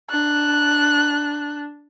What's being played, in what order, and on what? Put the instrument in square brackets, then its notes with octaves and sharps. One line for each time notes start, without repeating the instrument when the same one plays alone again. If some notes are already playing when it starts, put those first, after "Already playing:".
[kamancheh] D4 [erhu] F#6